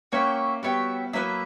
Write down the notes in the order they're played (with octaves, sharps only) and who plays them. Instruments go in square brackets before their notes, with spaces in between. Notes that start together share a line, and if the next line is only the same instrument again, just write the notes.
[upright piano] A#3 C#4 [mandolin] F#4 C#5 E5 G5
[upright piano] G3 B3 [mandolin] F#4 C#5 E5 G5
[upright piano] F#3 A#3 [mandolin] B3 E4 B4 E5